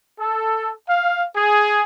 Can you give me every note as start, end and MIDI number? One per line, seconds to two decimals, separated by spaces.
0.20 0.71 69
0.89 1.25 77
1.35 1.84 68